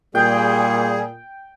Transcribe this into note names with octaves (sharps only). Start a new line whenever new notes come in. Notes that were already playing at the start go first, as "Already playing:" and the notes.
A#2 G3 G#4 G5